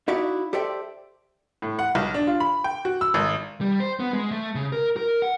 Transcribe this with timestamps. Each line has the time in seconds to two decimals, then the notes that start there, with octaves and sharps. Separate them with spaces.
0.08 D#4 E4 F#4 D5 E5 F5
0.53 G4 A4 C5 D5 E5 G5
1.62 A2
1.79 F#5
1.95 B1
2.14 D4
2.27 F4
2.40 B5
2.64 G5
2.85 F#4
3.01 E6
3.14 G#1
3.61 G3
3.80 C5
4.00 B3
4.13 G#3
4.31 A3
4.55 C#3
4.72 A#4
4.97 A#4
5.22 F#5